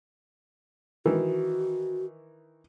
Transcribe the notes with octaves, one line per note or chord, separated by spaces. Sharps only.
D#3 E3 F#4